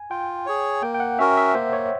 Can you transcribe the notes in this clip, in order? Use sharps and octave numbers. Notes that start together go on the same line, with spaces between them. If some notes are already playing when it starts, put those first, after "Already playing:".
Already playing: G#5
F4 G5
G#4 C#5
A#3 G5
G5
F#5
C#4 F#4 A#4 E5
E5
A#3 C5
C#5